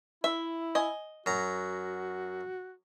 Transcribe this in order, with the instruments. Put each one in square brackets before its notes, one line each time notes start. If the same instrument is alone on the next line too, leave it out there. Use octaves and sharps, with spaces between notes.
[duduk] E4 [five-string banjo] E5
[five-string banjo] D#5 G#5
[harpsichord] F#2 A#5 [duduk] F#4